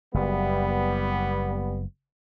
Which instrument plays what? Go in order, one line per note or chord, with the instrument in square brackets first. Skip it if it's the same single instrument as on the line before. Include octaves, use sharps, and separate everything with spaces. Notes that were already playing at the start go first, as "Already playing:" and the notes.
[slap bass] F#1 [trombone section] G3 B3